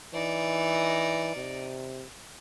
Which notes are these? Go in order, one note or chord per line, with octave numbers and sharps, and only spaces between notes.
E3 D#4 D5
C3